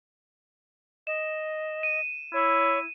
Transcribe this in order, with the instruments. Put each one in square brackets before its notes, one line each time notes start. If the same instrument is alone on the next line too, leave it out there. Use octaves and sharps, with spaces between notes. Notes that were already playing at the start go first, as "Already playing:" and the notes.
[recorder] D#5 [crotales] E7
[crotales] D#7
[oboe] E4 [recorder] C#5